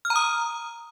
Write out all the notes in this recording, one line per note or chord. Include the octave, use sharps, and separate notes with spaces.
F6
A#5
D#6